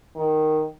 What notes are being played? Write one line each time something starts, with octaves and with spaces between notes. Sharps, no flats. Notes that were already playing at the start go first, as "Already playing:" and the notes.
D#3